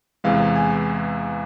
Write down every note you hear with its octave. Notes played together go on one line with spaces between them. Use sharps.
E2 C3 E3 G#3 F5
G#5